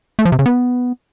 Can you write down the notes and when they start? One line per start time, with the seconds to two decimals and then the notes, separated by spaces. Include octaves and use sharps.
0.19 A3
0.25 F3
0.32 C3
0.39 C#3
0.46 B3